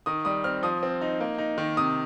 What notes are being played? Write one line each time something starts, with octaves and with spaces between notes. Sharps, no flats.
D#3 D#6
G3 D#6
C4 F6
F3 D#6
C4
D#4
A#3
D#4
D#3
C3 D#6